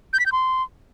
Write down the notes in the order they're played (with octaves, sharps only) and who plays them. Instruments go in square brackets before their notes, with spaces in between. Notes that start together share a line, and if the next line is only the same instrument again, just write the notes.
[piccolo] G6
B6
G6
C6